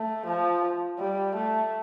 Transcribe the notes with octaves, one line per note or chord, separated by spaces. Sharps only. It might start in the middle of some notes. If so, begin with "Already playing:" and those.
Already playing: A3
F3
G3
A3